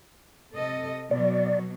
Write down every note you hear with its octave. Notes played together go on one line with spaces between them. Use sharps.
C3 A4 D#5
B2 F#3 D5